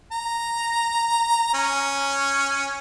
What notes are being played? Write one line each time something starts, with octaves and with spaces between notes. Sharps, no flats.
A#5
C#4